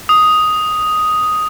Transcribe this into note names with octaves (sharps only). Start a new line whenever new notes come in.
D#6